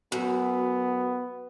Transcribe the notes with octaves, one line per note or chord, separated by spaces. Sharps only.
F#2 B3